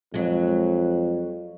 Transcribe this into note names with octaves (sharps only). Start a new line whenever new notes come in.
F2 F#3 G#3